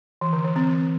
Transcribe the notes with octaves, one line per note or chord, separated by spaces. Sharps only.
E3
D3
E3
C4